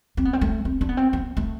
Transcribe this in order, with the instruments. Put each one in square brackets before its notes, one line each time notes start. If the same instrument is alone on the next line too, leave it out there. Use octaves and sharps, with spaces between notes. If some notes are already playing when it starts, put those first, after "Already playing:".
[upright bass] C4
B3
C4
A3
C4
D4
B3
C4
B3
A3